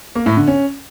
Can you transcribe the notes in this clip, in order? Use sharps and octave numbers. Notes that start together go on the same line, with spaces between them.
A#3
A2
D3
C#4